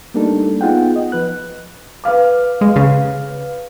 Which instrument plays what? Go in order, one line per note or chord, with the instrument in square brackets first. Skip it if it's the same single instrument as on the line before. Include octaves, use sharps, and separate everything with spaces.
[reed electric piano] G3 A3 A#3 D4 D#4 A4
B3 D#4 F4 G#4 F#5 G5
D#5
F3 B4 F#6
[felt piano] B4 F5 D6
[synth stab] G#3
C#3